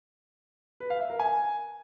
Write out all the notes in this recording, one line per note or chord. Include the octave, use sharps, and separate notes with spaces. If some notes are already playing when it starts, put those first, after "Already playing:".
B4
F5
E5
A#4
G#5